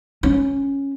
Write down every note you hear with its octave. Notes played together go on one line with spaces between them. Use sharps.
C#4